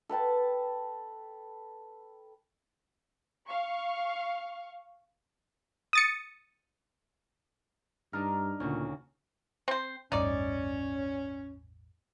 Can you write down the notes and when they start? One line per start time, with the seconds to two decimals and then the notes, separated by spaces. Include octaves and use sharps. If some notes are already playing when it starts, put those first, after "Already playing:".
0.09 A4 B4 G5 A5
3.48 F5 C#6
5.93 D#6 A6 C#7
8.13 G2 D4 D#4 A#4
8.60 D2 A#2 C#3 C#4 F#4
9.68 C4 C5
10.12 A1 E2 G2 C#4 D#4 D5